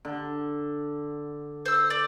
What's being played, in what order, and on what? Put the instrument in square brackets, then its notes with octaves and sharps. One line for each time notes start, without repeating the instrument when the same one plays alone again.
[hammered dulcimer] D3
[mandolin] C5 E6
D5